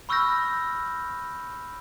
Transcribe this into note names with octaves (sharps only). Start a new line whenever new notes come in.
B5 C#6 E6 F6 G6 A#6